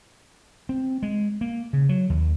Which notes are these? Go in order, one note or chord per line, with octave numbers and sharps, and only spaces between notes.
C4
G#3
A#3
C#3
F#3
D#2